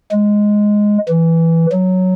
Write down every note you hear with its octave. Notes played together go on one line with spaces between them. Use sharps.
G#3
E3
F#3